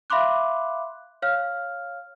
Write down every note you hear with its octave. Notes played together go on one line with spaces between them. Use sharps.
E5 F5 B5 C6 D6 F#6
C#5 F5 F6